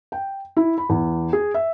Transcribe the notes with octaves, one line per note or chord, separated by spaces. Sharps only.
G5
E4
B5
E2
G#4
E5